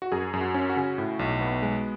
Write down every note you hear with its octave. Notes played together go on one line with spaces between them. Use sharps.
F#4
F#2 G#4
F#2
F#4
C#4
F#4
C#3
A2
B1
B3
G#3